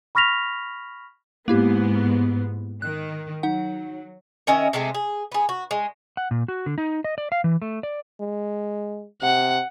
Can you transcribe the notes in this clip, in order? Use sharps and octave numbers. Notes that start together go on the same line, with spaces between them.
B5 C#6 F6 A#6 B6 F7
G#2 A#3 B3 E4 G4
D#3 F#6
F#3 D#4 F#5
D#3 C#4 D#5 E5
C3 G#3 A3 C4
G#4
B3 G#4
F#4
G#3
F#5
A#2
F#4
D3
D#4
D#5
D5
F5
E3
A3
D5
G#3
C3 F#5